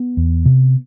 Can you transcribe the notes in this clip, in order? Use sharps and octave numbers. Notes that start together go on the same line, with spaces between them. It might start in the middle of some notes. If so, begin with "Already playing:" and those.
Already playing: B3
E2
C3